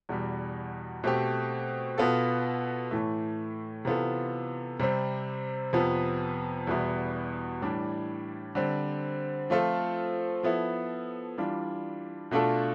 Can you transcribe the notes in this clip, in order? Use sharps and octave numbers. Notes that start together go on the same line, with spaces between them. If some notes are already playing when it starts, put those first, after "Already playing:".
E2 B2 G3
B2 A3 C4 G4
B2 B3 F4 A4
A2 E3 A3
C3 E3 B3 F4 A4
C3 G3 C4
F2 C3 F3 B3
E2 B2 G3 B3 E4
A2 E3 G3 D4
D3 G3 C4
F3 A3 C4 F4 A4
F3 B3 E4 A4
E3 G3 D4 F4
B2 A3 D4 F4 A4